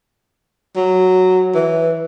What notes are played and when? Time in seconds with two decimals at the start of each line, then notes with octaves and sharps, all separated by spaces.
0.76 F#3
1.54 E3